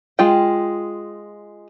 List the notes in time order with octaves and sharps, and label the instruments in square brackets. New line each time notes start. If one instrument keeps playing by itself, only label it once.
[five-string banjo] G#3 F4 G5